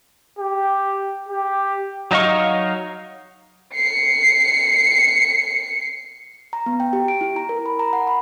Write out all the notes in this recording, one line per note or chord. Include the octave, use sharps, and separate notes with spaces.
G4
G4
F#3 D#4 D#5 F5 C#6
C7 C#7
A#5
B3
G5
G4
D7
E4
A#5
A#4
B5
A#5
F#5
B5